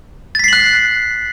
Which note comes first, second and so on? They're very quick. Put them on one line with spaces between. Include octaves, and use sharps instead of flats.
A6 B6 C7 F#7 F#6